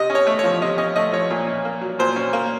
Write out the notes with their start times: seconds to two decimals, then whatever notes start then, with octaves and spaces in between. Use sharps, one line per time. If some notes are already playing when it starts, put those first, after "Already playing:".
Already playing: C3 D#5
0.10 C#4
0.15 C#5
0.27 A3
0.39 F3 C#5
0.62 C3 D#5
0.78 C#4 D#5
0.96 A3 D#5
1.12 F3 C#5
1.30 A#2
1.47 C#4
1.65 A#3
1.81 F#3
1.99 A#2 C5
2.16 C#4
2.33 A#3